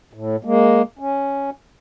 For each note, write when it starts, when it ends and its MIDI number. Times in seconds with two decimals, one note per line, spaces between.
0.13 0.36 45
0.44 0.82 56
0.44 0.82 58
0.99 1.50 61